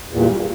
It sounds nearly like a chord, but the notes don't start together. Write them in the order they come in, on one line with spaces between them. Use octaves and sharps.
E2 A#2 G2